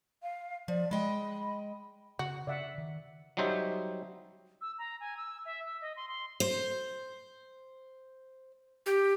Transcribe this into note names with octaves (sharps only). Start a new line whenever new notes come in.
F5
F3 D5
G#3 D#5 G5 B5
C#3 F#4
C#3 D5 E5 F#5
D#3
F#3 G3 D#4 C5 E5
E6
A#5
G#5
E6
E5
E6
D#5
C6
C6
C5
G4